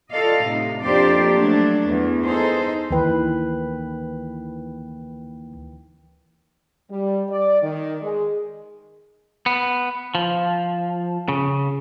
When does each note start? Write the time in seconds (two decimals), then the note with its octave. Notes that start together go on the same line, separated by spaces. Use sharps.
0.11 F4 A4 D5 D#5 F5
0.43 A2 C3 D#4
0.83 F2 A#3 D4 G4 C5 D5
1.36 F#3 A3 D4
1.88 E2
2.23 D#4 G#4 A4 C5
2.90 D2 D#3 E3 A#3 B4 G5
6.90 G3
7.29 D5
7.62 D#3
8.01 G#3
9.46 B3
10.15 F3
11.29 C#3